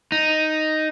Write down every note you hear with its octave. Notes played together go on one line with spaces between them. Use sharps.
D#4